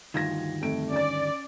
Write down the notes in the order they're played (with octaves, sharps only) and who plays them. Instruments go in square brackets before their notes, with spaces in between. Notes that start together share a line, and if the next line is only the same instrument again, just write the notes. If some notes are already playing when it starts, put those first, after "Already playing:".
[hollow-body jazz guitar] D2 G2 D#3 [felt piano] F4 G#6 A#6
[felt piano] F2 A3 D7
[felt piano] C#4 A6 [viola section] D5